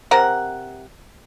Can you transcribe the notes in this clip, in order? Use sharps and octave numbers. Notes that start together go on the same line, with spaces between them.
C3 A#4 F#5